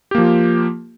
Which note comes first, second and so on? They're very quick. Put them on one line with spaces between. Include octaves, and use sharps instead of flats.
G4 A#3 F3 F4